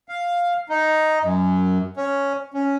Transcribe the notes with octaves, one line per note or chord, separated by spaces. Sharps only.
F5
D#4
F#2
C#4
C#4